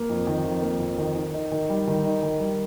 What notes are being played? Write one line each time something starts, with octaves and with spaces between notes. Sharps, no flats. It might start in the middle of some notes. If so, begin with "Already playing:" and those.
Already playing: A#3
F2
D#3
F2
A#3
F2
D#3
D#3
D#4
D#3
G3
D#3
D#4
D#3
G3